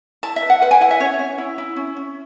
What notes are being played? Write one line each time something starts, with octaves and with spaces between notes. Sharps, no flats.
E4 A5
E5
B4
F#5
B4 F#5
G#5
E4 F#5
E5
C#4 C#5
C#4
E4
E4
C#4
C#4